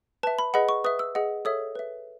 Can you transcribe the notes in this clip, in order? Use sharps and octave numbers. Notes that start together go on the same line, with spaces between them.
B4 E5 A5
B5
G#4 B4 D#5 F#5 B5
C#6
B4 E5 D#6
E6
G#4 D#5 F#5
A4 C#5 E5 D#6
B4 E5